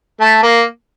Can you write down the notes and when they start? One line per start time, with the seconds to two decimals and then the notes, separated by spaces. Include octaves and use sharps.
0.21 A3
0.43 A#3